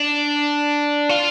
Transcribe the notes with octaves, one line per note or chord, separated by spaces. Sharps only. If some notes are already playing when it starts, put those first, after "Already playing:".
Already playing: D4
F4